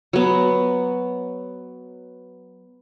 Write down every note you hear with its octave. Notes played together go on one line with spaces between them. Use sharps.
F#3 B3